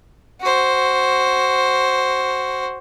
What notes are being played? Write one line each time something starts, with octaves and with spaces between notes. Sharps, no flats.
F#4 C5